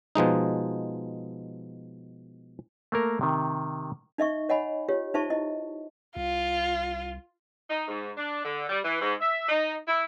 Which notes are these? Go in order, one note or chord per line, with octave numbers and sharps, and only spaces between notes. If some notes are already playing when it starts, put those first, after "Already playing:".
B2 F3 G#3 D#4
A3 A#3 A#4
C3 D#3
D#4 D#5 E5 C#6
C#5 D#5 F#5 G#5 B5
F4 G4 C#5
D#4 F4 C5 E5 A5 C#6
E4 D#5
C2 F4
D#4
G#2
D4
D3
G3
E3
G#2
E5
D#4
E4